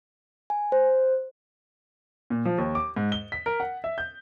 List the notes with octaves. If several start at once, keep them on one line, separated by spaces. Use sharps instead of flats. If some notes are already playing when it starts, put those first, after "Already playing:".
G#5
C5
A#2
F3
D#2
D6
G#2
G7
B6
A#4
F#5
E5
G6